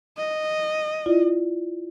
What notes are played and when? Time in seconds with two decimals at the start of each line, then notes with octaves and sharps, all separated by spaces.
0.17 D#5
1.06 E4 F4 D5